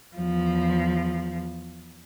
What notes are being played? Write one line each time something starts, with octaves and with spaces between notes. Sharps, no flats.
E2 F3